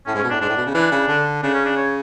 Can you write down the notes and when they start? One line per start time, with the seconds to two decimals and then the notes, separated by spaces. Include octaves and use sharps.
0.06 A2 C#4
0.15 G#2
0.17 C#4
0.24 B2
0.30 A2 D4
0.41 G#2 D4
0.49 A2
0.57 B2
0.66 C#3
0.74 E3 D4
0.92 C#3
1.08 D3
1.42 C#3 D4
1.54 C#4
1.65 D4
1.77 C#5